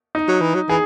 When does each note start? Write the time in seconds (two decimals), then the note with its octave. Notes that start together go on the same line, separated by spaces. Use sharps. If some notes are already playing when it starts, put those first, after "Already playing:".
0.15 D#4
0.28 F#3
0.41 E3
0.55 F#3
0.69 E3 G#4